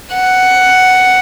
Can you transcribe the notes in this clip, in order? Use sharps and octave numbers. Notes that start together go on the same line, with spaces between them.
F#5